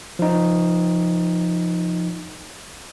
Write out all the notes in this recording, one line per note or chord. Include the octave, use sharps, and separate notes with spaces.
F3 D#4